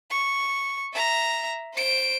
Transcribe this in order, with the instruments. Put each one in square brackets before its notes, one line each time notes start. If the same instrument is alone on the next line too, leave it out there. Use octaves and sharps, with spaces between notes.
[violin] C#6
E5 A#5
C5 D7